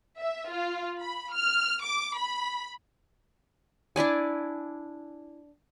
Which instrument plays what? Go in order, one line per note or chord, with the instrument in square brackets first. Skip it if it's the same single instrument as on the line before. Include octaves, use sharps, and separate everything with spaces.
[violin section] E5
F4
B5
F6
D6
B5
[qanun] D4 E4 D5 G#5